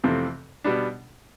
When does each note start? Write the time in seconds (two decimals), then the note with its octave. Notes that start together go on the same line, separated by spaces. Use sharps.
0.04 F2 C3 E3 A3 C4
0.64 B2 G3 B3 D4